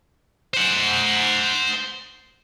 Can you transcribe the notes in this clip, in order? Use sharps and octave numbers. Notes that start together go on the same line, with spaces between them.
C5 F#5